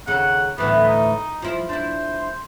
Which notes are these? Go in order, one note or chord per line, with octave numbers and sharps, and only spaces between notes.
D#2 C#3 F#5
D2 A2 E3 B3
D#4
F3 E4
D4 E4 C5